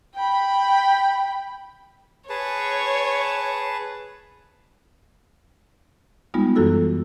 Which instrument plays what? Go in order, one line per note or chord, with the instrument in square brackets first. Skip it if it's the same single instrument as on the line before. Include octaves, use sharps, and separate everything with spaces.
[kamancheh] G5 B5
[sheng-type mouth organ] G#4 B4 A5 [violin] C#5
[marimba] G3 G#3 B3 D#4 F4
F#2 E3 F4 F#4 A4 E6